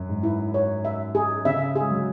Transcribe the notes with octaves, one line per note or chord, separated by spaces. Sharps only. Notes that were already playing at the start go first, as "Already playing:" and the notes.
Already playing: F#2
G#2
E4
C#5
E5
G#4
C#3 E5
G#4
G#3
F#3